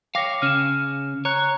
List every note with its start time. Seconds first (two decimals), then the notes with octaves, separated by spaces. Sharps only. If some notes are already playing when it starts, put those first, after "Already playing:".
0.15 C#5 F5 G5 D6 A#6
0.42 C#3 C#4 F6 E7
1.25 C#5 A#5 F#6